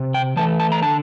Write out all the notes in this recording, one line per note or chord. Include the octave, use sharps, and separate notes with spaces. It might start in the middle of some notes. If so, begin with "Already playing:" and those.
Already playing: C3
G5
E3 A3 A5
A5
A#5
D3 A5